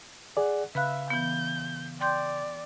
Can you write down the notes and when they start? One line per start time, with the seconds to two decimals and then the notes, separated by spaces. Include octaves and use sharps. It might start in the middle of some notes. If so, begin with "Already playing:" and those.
0.37 G#4 D5 F#5
0.75 C#3 B4 E5 F5 B5 F#6
1.10 E3 B3 G6
2.00 D5 G5 C6 G6